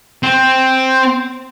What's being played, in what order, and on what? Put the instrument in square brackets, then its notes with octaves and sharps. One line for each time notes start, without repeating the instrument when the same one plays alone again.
[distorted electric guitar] C4